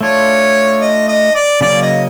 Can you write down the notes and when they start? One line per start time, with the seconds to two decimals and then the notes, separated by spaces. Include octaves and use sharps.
0.01 A3 D4 F4 C#5
0.81 D#5
1.08 D#5
1.35 D5
1.61 C#3 F#3 A#3 C#4 D5
1.82 D#5